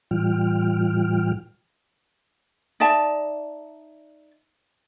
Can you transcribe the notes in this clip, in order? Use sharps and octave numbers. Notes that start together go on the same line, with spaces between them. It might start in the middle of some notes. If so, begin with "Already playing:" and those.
A2 E3 G3 F4 G5 F6
D#4 D5 E5 A5